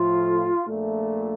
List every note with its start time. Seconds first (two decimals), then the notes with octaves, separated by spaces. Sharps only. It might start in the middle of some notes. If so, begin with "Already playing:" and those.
Already playing: A2 F3 A3 F4
0.68 A#1 A#2 A3